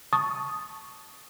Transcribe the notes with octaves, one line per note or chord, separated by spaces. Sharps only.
A5 C#6 D#6 A6